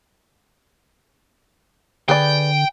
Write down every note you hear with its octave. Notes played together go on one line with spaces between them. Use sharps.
D3 G#4 B4 D5 G5